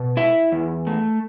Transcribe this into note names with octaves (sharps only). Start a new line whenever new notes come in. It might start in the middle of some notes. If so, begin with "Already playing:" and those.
Already playing: B2
E4 E5
E2
A3